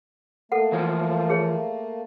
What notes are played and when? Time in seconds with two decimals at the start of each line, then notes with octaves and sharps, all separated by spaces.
0.52 A3 A#3 A4 F#5
0.72 E3 F3 C5
1.30 G#4 C#5